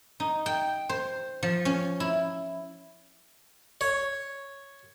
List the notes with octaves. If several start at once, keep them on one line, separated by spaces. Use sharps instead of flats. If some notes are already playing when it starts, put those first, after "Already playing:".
D#4
G5
C5
F3
C#4
E4
C#5